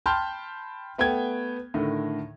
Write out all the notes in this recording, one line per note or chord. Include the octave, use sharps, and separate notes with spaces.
G5 A5 B5 C6 F6 G6
A3 B3 G5 G#6
A2 D3 D#3